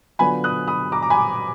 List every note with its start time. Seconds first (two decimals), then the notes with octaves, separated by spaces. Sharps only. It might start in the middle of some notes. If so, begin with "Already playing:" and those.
0.19 D3 F#3 B3 D4 F4 G#5 B5
0.44 D#6 F#6
0.68 B5 D#6
0.92 A#5 D6
1.02 A#5
1.10 G#5 B5